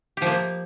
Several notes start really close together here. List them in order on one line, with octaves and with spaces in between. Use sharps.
G4 F3 A#3